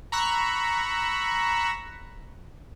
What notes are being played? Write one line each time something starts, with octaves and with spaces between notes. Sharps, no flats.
A#5 B5 C#6 E6 F#6